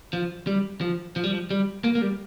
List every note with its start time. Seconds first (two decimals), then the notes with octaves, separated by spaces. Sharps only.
0.13 F3
0.47 G3
0.81 F3
1.16 F3
1.24 G3
1.32 F3
1.51 G3
1.84 A#3
1.95 A#3
2.02 G3